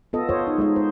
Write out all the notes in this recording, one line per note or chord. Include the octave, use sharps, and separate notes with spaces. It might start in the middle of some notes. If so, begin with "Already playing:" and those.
B3 F4 A4 D#5
F4 C5 C#5
D#4
G#3 D#4 D#5
C5